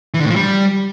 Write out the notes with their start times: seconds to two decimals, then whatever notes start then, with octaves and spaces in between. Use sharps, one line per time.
0.14 E3
0.20 D3
0.25 A2
0.30 F3
0.36 G3